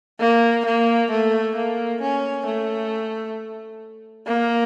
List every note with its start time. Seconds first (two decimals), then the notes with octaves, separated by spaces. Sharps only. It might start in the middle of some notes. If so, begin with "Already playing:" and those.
0.20 A#3
0.65 A#3
1.11 A3
1.56 A#3
2.01 C#4
2.47 A3
4.27 A#3